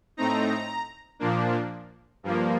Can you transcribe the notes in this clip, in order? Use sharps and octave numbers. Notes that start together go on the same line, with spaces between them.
A2 A3 C4 D#4 A#5
A#2 F3 A#3 D4
G2 F3 A#3